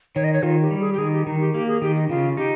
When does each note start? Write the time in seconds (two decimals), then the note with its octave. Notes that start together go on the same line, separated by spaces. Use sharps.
0.15 D#3 C#5
0.24 D#5
0.33 C#5
0.43 D#3 F4
0.62 G4
0.71 G3
0.80 G#4
0.93 G4
0.98 D#3 G#4
1.12 G4
1.26 D#3 D#4
1.40 G4
1.54 A#3 G4
1.68 G#4
1.82 D#3 G4
1.95 D#4
2.09 C#3 F4
2.37 D#4 G4